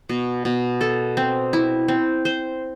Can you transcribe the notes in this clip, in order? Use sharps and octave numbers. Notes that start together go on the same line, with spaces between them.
B2
B2
A4
C4
E4
C4
C5